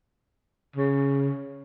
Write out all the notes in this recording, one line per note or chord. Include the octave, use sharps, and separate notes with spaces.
C#3